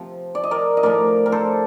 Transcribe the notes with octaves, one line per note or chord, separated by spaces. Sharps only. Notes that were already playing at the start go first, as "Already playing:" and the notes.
Already playing: C3 F3
D5
D#5
A#4 D5
D#5
A2 F3 A#4 D5
A#4
A4 C5